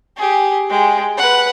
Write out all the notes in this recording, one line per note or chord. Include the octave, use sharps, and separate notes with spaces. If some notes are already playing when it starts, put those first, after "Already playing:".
G4 G#4
G#3 G5
B4 F#5